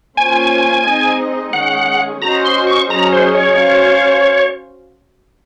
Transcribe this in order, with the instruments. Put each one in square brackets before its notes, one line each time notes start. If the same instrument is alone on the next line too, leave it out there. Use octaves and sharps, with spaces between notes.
[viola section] A#3 C#4 F4 C5 [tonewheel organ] G#5
[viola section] G#3 C4 D#4 G#4 D#5
[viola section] D#3 G#3 C#4 G#4 [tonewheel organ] F#5
[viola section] C#4 F#4 C5 D#5 [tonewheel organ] A#5
[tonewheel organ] C6
C#6
[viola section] F#3 C#4 G#4 D#5 [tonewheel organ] A#5
[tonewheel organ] C5
C#5
[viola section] C#4 F#4 C5 F5